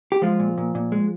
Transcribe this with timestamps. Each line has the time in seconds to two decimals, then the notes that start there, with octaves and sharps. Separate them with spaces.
0.12 G4
0.22 F3 G#3 F4
0.39 A#2
0.58 A#2
0.75 A#2
0.92 G#3